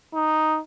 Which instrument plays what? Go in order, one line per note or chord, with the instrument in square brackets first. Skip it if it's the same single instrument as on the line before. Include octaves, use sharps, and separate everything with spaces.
[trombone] D#4